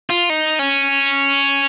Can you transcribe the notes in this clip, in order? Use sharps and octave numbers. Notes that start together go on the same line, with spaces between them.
F4
D#4
C#4